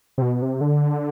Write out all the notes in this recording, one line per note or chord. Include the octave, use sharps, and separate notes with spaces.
C3
B2
C3
D3